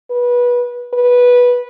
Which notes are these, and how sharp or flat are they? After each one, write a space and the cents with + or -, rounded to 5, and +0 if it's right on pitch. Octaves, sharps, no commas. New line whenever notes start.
B4 -20
B4 -10